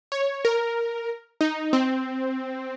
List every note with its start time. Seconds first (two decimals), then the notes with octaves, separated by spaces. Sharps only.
0.12 C#5
0.45 A#4
1.41 D#4
1.73 C4